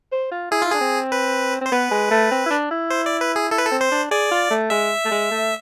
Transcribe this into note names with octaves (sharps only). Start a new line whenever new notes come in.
C5
F4
E4 G#4
E4 F4
D4 G#4
C4
B4
C4 C5
B3 B4
G#3
A3
C4
E4
D4
E4
C5
D5
B4
G#4
E4 A4
B4
A4
C4
C5
D4
G#4 D5
F4
A3
G#3 E5
A3
G#3
A3